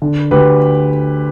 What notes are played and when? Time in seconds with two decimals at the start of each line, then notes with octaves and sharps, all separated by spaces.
0.02 D3
0.31 D2 G4 B4